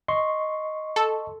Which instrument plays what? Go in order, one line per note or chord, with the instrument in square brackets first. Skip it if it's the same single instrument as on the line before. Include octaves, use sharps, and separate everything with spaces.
[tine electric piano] D#5 C6 C#6
[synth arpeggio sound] A4